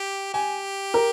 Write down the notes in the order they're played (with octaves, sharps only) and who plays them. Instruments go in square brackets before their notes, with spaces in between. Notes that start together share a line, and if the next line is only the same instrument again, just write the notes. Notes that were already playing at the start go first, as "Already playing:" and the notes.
Already playing: [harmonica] G4
[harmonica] G4 [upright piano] G#5
[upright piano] A#4